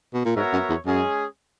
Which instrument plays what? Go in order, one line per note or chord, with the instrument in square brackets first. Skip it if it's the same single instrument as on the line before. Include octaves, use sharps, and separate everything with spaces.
[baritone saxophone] B2
A#2
[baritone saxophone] G#2 [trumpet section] B3 F#4 A#4 C#5 E5
[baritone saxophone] F#2
E2
[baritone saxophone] F#2 [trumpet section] G#3 C#4 G#4